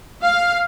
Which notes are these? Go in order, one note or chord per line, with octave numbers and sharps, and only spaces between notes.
F5